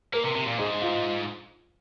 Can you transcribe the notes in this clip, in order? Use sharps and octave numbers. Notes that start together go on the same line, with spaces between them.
A#3 A#4
C3
C3
A#2
G#2 G#4
F4